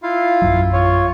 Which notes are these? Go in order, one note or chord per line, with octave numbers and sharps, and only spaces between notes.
E4 F4 F5
A#1 F#2 F#3
F4 C#5